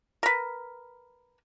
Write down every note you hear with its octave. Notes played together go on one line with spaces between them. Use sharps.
A#4 B4